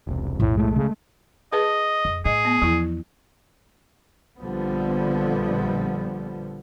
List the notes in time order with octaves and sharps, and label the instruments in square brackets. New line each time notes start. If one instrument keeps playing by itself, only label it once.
[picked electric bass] E1 C2
[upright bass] B1 F2 [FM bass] A2
[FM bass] A2 [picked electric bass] G#3 A3
[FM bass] C#3
[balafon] G#4 B4 A5 [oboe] D#5
[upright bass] F2
[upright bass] A2 [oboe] G#4 [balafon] D#5
[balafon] B3
[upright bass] E2 [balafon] F3 E4
[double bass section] A#1 D3 F3 G3 B3